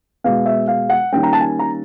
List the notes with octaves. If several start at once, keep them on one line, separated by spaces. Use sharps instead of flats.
B2 G#3 B3 F5
E5
F5
F#5
D#3 G3 A#3 C#4 G5
A#5
A5
G#5
A#5